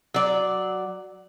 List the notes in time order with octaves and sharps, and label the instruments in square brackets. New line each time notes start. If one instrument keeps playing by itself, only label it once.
[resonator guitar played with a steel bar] F#3 D5